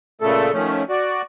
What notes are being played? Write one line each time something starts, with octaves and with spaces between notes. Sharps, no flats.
A#2 C#3 A3 A4
D#3 F3 A3 C#4
F#4 D5